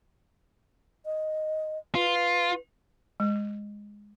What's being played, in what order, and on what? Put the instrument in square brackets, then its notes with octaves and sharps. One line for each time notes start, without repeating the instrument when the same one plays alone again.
[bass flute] D#5
[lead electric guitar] F4 [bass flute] B4
[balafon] G#3